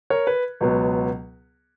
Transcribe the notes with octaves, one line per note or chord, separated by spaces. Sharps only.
A#4 C#5
B4
C#2 B2 F#3 B3